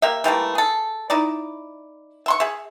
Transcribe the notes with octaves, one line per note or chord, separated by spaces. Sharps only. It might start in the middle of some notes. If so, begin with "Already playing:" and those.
A#3 G4 E5
E3 G3 A3 A#3
G#4 A4
D#4 E4 D5
E5 C6 C#6
G#4 E5